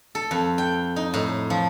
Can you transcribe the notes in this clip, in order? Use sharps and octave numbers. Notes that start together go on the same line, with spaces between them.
A4
F2
G5
D#4
A2
F3